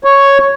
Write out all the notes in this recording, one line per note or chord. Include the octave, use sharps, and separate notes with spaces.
C#5